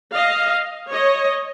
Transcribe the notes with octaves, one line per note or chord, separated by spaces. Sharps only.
D#5 F5
C#5 D#5